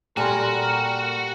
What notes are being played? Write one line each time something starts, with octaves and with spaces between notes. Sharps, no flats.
A#2 G3 F#4 A4 A#4 G#5 C6